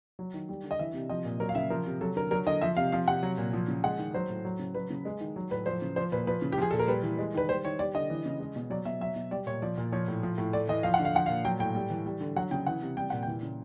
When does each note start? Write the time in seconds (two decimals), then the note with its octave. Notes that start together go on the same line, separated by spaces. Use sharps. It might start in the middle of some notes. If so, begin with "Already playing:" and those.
0.19 F#3
0.34 D#3
0.49 G3
0.64 D3
0.71 D#5
0.79 E3 E5
0.94 C3
1.09 F3 D#5
1.25 A#2
1.40 F#3 A#4
1.49 F5
1.55 C#3 E5
1.70 F3 A#4
1.86 C3
2.01 F#3 A4
2.16 D3 A#4
2.31 F#3 A#4
2.46 D3 D#5
2.61 F3 E5
2.77 C3 F5
2.92 F3 F5
3.08 C3 F#5
3.23 F#3
3.38 A#2
3.53 F3
3.68 C#3
3.84 G#3 F#5
3.99 D#3
4.14 F#3 C5
4.30 A2
4.45 F#3
4.59 C#3
4.75 F#3 B4
4.90 C#3
5.05 G#3
5.20 D#3
5.36 F#3
5.51 A2 B4
5.66 F3 C5
5.82 C#3
5.96 F3 C5
6.12 A#2 B4
6.27 F3 B4
6.42 C#3
6.52 G4
6.58 F3 G#4
6.71 A#2 A4
6.79 A#4
6.88 G3 B4
7.03 E3
7.19 G#3
7.34 D#3 B4
7.49 G3 C5
7.65 D#3 C#5
7.79 G3 D5
7.95 D3 D#5
8.10 E3
8.25 C#3
8.40 G#3
8.56 B2
8.70 F#3 D5
8.85 B2 E5
9.01 F#3 E5
9.16 B2
9.31 G3 D5
9.47 A#2 C#5
9.62 F3 D5
9.78 A#2
9.92 F3 C#5
10.08 A2
10.23 F3
10.38 A2
10.53 A3 D5
10.68 E3 D#5
10.83 F3 F5
10.94 F#5
10.99 D3
11.05 F5
11.15 F3 F#5
11.26 F5
11.29 A#2
11.44 F#3 G5
11.59 A2 G5
11.75 G3
11.90 E3
12.06 G3
12.21 D3
12.36 F#3 F#5
12.51 C#3 G5
12.66 E3 F#5
12.82 C3
12.97 G3 G5
13.10 A#2 F#5
13.23 E3 G5
13.43 C#3